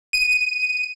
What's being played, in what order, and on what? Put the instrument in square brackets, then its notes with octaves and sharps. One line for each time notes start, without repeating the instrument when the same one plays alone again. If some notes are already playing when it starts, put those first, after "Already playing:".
[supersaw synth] D#7